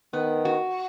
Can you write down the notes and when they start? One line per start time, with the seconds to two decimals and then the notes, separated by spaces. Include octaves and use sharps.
0.13 D#3 B3
0.45 F#4